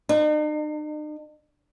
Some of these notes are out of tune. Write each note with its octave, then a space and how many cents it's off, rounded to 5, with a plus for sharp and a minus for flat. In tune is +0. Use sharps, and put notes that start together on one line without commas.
D#4 -45